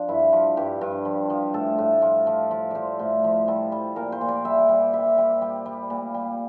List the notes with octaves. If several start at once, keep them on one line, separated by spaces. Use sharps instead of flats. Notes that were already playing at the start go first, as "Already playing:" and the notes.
Already playing: F3 D4
G2 E4
F3
G2 G4
G2
F3
F3
A2 A4
A2
F3
F3
F3
F3 C5 D5
A2 C5
F3
G3 A4
G3
A#2 A#4
C5
A#2
D5
G3 E5
G3
G3 E5
G3
G3
G3
A#2
G3